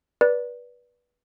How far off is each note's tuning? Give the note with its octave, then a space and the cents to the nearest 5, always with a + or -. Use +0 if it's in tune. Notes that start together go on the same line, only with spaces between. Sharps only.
B4 -20 D5 -5